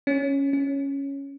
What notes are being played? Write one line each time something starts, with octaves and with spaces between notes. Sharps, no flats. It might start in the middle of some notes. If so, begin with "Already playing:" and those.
C#4
C#4